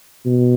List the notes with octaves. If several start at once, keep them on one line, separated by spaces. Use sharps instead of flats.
B2